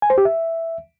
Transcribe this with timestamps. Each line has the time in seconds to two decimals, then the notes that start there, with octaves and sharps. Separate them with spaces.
0.02 G#5
0.10 C5
0.18 G4
0.25 E5